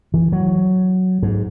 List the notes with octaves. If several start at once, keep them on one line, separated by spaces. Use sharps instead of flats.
E3
F#3
G#2